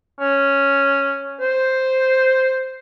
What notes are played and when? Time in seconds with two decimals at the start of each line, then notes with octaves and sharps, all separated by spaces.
0.20 C#4
1.41 C5